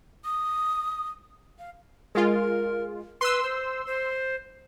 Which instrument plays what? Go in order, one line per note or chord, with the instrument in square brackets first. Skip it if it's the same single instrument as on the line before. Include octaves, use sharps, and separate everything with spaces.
[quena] D#6
F5
[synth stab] G#3 F4 [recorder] A#4
[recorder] B4 [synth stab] C6 E6
[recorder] C5
C5